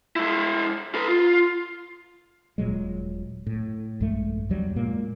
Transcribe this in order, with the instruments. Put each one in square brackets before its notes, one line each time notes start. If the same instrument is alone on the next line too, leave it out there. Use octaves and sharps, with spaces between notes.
[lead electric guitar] G#3 E4
A4 B4
F4
[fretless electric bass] D#1 A#2 F#3 G#3
A2
A#1 G2 G#3 A3
E2 G2 F#3 G3
A#2 G#3 A#3